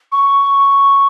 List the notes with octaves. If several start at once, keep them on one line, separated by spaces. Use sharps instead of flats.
C#6